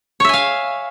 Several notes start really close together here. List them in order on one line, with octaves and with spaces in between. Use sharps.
C#5 E5 G#5 F5